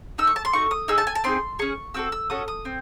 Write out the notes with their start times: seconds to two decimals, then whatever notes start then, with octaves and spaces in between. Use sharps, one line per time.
0.18 D#4 A4 E6
0.27 C#6
0.36 A5
0.45 C6
0.53 A3 D#4 F#4 C#6
0.71 D#6
0.88 D#4 G#4 E6
0.98 A5
1.07 G#5
1.15 A5
1.24 C4 D#4 G#4 C6
1.59 C#4 G#4 C#6
1.94 C4 F#4 A4 E6
2.12 E6
2.30 C#4 F#4 A4 D#6
2.48 D#6
2.65 C4